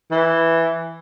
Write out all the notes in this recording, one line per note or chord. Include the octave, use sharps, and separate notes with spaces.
E3